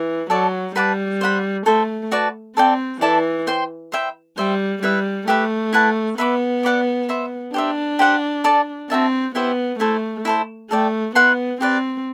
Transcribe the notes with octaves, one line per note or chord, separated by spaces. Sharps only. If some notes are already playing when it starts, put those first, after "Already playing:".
Already playing: E3
F#3 A4 D5 A5
G3 B4 F#5 A5 D6
C5 F#5 B5
A3 A4 C5 E5
F#4 B4 D5 A5
C4 A4 D5 G5
E3 E4 A4 D5 A5
C5 G5 C6
C5 E5 G5 B5
G3 C5 E5 G5
G3 E4 B4 E5
A3 G4 B4 E5 B5
E4 B4 F#5 A5
B3 B4 E5 B5 D6
D5 F#5 B5 D6
C5 E5 B5
D4 G4 C5 E5
G4 C5 F#5
A4 D5 A5
C4 F#4 A4 E5 A5
B3 E4 G4 C5 E5
A3 E4 A4 C5
E4 A4 C5
A3 A4 D5 G5
B3 E4 B4 F#5 C6
C4 G4 B4 D5